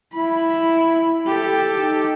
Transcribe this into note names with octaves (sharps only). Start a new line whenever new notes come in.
E4 B5
G4 A4
D#4